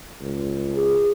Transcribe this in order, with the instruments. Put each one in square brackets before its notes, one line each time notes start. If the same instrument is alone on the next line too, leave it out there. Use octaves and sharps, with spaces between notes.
[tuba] C#2
[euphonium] G#4